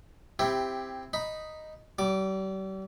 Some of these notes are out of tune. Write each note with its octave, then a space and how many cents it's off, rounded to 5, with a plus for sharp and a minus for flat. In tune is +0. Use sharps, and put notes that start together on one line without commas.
C4 +0 E4 +10 G4 +15
D#4 +0 B5 +0
G3 -40 D6 +0